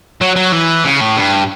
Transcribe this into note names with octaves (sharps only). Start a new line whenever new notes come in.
F#3
F#3
E3
C#3
A2
G2